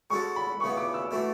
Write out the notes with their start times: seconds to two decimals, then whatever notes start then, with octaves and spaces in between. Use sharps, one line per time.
0.10 G#3 C#4 F#4 A4 C#6
0.36 B5
0.60 C#2 C#3 E3 B3 C#6
0.77 D6
0.94 E6
1.11 E3 A3 D4 F#4 E6